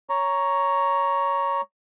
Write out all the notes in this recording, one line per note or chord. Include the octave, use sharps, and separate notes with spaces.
C#5 A#5